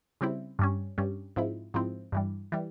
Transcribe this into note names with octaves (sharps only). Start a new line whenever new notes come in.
C#3 G3 C4 E4
G2 G3 C#4
G2 G3 C#4
G#2 F3 C4 E4
G#2 F3 C4 E4
G2 E3 G3
E3 G3